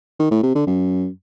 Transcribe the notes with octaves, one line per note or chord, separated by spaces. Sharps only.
D#3
A2
C3
D3
F#2